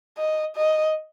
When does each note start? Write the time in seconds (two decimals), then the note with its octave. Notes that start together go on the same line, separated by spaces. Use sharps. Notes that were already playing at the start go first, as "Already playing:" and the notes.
0.18 D#5
0.57 D#5